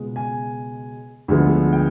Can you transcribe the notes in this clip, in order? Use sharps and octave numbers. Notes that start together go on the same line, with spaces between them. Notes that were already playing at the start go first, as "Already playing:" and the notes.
Already playing: C#2 B2 G#3 B3
G#5
D2 D3 F3 G#3 B3
G5